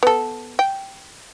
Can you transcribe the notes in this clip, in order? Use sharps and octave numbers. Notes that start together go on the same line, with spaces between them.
B3 A4
G5